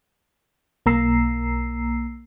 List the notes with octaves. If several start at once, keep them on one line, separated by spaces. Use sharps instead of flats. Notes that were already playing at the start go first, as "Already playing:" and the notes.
B1 A#3 A#5 E6 C7